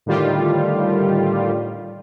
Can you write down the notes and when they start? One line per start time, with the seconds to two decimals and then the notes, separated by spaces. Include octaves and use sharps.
0.06 A2 D3 D#3 G3 F4 G4